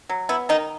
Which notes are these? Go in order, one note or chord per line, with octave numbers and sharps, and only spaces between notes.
F#3
B3 E4
D#3 D#4